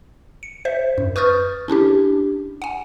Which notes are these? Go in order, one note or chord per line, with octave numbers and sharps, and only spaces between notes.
C#7
C5 E5
F#2
B4 C#6 D#6 F6 G6 A6
C#4 D4 E4 G4
F#5 G#5